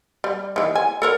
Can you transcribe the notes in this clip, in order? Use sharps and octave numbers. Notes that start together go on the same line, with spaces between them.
G3
D#3 E3
G#5
A4 A#4 C#5